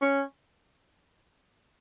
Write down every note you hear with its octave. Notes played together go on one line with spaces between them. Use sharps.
C#4